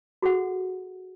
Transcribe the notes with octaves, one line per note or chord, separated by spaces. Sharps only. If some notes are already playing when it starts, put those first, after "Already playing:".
F#4 G#4 A4 F#5